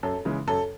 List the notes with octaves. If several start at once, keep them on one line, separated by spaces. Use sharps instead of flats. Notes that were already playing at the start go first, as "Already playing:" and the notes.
F#2 A4
C#3 E3 G#3
F#2 A4